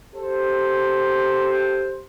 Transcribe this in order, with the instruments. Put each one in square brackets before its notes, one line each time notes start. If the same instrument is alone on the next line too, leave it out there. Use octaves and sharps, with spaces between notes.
[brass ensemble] G4 A4 C5